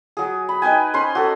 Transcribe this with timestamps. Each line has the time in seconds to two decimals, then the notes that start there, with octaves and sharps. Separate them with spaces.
0.17 F#3 G#4
0.49 B5
0.62 D#4 B4 G5 G#5
0.94 C#4 C5 B5 C6
1.15 F#4 A4